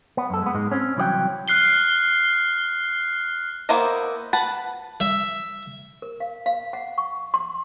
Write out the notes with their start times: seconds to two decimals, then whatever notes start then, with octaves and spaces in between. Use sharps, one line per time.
0.17 B3
0.30 F#2 A4
0.42 G#3 B3
0.54 G#2 G#3
0.72 C4 C#4
0.97 C2 E3 F#3 D5 G5
1.48 F6 F#6 C7 G7
3.69 A#3 B3 E4 C5 D#5
4.33 B4 F#5 A5
5.00 E5
6.02 A#4
6.20 F5
6.46 F5
6.73 F#5
6.98 C#6
7.34 C6